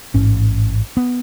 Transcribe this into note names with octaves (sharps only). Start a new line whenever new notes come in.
A1 G#2 C#4
B3